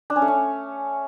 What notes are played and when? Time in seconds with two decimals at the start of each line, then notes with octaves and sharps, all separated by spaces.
0.10 D4
0.16 C#4
0.22 A3
0.28 C#4